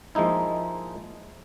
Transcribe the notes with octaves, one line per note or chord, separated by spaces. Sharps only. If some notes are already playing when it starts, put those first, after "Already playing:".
F3 G#3 A#3 D#4 E4